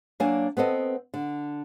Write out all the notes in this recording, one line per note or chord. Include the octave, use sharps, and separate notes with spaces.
F#3 A#3 D4 G#5
B3 C4 A4 D#5
D3